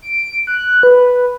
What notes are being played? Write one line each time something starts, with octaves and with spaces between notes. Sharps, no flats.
D7
F#6
B4